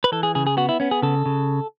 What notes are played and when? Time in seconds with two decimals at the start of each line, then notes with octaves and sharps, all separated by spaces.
0.04 B4
0.12 E3 A4
0.23 G#4
0.35 C#3 G#4
0.47 G#4
0.57 B3 F#4
0.69 E4
0.80 B3 C#4
0.91 G#4
1.02 C#3 A4
1.26 C#3